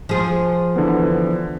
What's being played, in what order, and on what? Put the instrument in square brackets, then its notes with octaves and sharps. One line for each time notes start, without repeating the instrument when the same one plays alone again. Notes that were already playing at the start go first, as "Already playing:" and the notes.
[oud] F3 G#4
[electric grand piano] D3 E3 B3